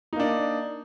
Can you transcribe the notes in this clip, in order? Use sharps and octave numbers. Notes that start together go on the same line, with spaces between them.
A#3 D4 D#4